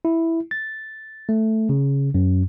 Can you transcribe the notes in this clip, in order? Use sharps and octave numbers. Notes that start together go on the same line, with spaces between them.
E4
A6
A3
C#3
F#2